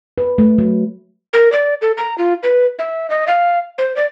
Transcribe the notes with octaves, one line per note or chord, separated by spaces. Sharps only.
B4
A3
F#3
A#4
D5
A4
A#5
F4
B4
E5
D#5
F5
C5
D5